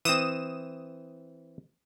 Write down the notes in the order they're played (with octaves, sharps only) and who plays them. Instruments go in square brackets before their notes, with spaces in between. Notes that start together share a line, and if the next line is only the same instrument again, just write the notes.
[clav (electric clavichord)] E3 C4 [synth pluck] D#6 E7